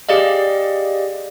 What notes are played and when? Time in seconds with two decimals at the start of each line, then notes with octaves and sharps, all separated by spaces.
0.09 G4 G#4 D5 D#5 F5